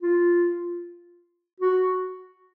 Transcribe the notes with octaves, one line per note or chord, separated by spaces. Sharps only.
F4
F#4